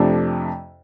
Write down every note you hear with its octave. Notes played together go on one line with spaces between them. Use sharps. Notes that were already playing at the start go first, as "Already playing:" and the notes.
Already playing: F2 C3 F3 A3 D4